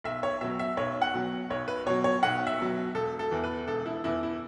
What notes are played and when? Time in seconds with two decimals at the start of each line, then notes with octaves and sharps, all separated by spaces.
0.04 B1 E5
0.23 C#5
0.41 B2 F#3 E5
0.59 E5
0.77 B1 C#5
1.02 F#5
1.14 B2 F#3
1.50 B1 C#5
1.68 B4
1.86 B2 F#3 C#5
2.04 C#5
2.23 B1 F#5
2.47 E5
2.59 B2 F#3
2.95 E1 A4
3.19 A4
3.31 E2 E3
3.44 B4
3.68 E1 A4
3.86 E4
4.04 E2 E3 E4
4.23 E4